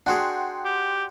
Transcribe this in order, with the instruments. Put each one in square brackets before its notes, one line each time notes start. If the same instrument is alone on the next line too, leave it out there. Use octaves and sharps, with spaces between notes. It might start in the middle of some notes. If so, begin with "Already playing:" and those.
[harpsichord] D4 F#4 G#4 [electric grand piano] F#5 G5 C6
[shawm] G4